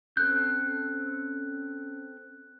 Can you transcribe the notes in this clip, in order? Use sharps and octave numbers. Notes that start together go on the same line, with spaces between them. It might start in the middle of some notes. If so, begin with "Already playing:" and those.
C4 C#4 A4 F#6 G6